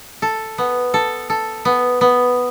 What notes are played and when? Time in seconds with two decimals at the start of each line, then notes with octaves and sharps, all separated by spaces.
0.22 A4
0.58 B3
0.94 A4
1.30 A4
1.65 B3
2.01 B3